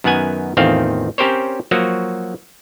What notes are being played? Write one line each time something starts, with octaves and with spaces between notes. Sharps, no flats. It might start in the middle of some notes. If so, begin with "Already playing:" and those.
F#2 D#3 B3 F#5 G#5
A1 E2 D#3 C4 F4 F5
C4 C#4 G4 A#4 C5 C#5
F3 F#3 A#3 F#4